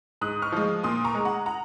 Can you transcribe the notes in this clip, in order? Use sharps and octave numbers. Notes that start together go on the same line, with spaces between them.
G#2 D#6 F#6
C#6 F6
F3 G#3
A#2 C6 D#6
A#5 C#6
G#3
F#5 A#5
F#5 A#5